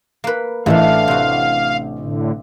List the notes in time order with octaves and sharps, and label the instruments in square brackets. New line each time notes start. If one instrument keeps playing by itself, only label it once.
[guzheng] A#3 B4
[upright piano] A1 [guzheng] E3 A3 D4 [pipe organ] F5
[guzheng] C3 F#4
[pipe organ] A2 D3